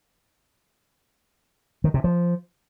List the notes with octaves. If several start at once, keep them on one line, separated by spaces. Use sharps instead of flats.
D#3
C3
F3